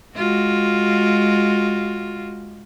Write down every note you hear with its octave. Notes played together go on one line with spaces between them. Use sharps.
G#3 F4 F#4